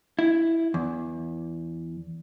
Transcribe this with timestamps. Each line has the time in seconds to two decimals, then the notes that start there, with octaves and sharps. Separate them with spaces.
0.19 E4
0.74 E2